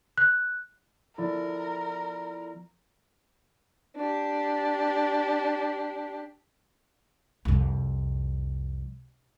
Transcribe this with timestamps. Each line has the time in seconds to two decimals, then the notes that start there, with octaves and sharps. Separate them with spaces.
0.18 F#6
1.18 F3 B3 E4 A4 A#4 D5
3.96 D4 G4
7.45 C2 F2